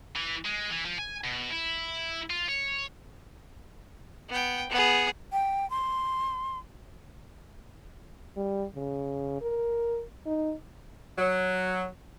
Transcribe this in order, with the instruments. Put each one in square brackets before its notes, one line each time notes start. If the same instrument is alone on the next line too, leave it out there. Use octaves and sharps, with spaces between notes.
[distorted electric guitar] E3
G#3
E3
F3
G#5
B2
E4
F4
C#5
[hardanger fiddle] B3 G5
B3 G#4
[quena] G5
C6
[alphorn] G3
C#3
A#4
D#4
[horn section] F#3